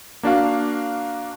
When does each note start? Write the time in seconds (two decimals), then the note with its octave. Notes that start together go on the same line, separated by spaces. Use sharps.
0.23 A#3 D4 F#4 F5